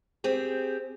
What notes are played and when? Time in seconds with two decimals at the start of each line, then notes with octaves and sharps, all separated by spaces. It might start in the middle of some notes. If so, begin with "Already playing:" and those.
0.24 C4 G4 G#4